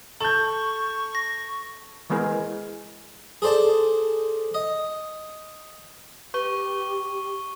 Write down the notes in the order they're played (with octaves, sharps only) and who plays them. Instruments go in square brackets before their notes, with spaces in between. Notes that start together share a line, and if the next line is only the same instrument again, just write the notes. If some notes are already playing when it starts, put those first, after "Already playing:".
[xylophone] A4 [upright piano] A5 G6 [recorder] C#6
[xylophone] A#6
[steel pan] E3 G#3 B3 G#4 A#4
[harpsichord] G#4 A4 C5 D5 A5
D#5
[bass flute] G4 [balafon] B4 [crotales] C#6 G7